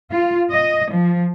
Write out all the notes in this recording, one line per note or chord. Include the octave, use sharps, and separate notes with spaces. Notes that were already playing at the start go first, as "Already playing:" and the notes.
F4
D#5
F3